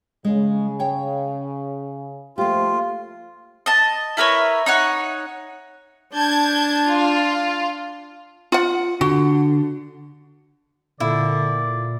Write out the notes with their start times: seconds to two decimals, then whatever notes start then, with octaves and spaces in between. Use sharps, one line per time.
0.25 C#3 G#3
0.79 C#5 G5
2.38 F3 A3 A#3 F4 G4 C5
3.66 D#5 A5
4.17 E4 A#4 B4 C#5
4.66 D#4 C#5 F#5
6.15 D4 A5 G6 G#6
6.86 F4
8.52 F4 F#5
9.01 D3 F#4
11.00 A#2 D3 E4 D5